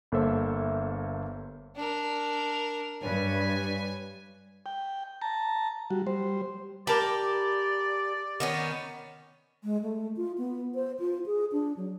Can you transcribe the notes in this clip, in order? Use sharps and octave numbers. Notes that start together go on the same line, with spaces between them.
G1 A#3 A4 C5 E5
D4 A#4
G2 B4 C#5 D5 G#5
G5
A5 A#5
G3 F#4
G3 C5
G4 A#4 D5 A5 B5
D#3 B3 C#4
G#3
A3
F4
B3
C5
F4
G#4
D4
F#3